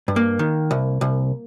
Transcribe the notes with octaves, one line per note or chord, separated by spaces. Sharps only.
G2
A#3
D#3
C2
C2